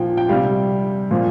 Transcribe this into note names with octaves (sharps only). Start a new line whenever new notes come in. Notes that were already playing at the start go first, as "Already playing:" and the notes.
Already playing: A#2 F3 G5
G5
C3 G3 F5
A#2 F3